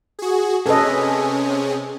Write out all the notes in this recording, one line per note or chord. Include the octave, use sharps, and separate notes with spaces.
F#4 G#4
C3 C#4 G#4 A4 B4 D#5